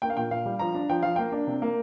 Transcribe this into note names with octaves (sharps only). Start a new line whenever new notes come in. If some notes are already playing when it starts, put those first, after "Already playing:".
A#3 G5
F5
A#2 G5
A#2 F5
G3
F3 A#5
D4
F3 G5
F3 F5
A#3 G5
D4
C3
A#3